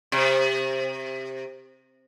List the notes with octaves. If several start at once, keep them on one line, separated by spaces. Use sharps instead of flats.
C3